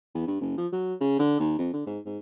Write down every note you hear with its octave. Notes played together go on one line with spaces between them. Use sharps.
E2
G2
F#1
F3
F#3
C#3
D3
D#2
F2
D3
G#2
G#2